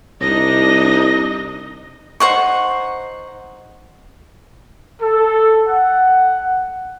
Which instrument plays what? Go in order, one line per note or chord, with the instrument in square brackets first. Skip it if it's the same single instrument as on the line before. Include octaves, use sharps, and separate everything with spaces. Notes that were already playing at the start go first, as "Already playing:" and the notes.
[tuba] C2 [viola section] D4 D#4 D#5 [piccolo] A#6
[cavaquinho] D#4 C5 F#5 C#6
[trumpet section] A4
F#5